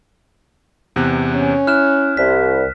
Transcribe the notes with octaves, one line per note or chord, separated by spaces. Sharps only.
E2 C3 F#6
C#4
E4 F6 F#6 E7
C2 B6